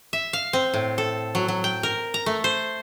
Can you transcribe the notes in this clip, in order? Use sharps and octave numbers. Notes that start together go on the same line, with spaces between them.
E5
F5
C4
A2
A4
F#3
F#3
G5
A#4
A#5
A3
C5